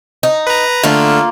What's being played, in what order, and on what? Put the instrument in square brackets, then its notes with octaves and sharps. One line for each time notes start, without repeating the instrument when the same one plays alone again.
[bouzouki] D#4
[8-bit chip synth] B4 A#5
[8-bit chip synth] D3 A3 [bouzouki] A#3 F4